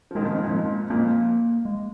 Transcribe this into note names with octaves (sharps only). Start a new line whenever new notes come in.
F3
A#2 D#3 G#3
F2
G#2
F2 A#2
F2 A#2 A#3
G#3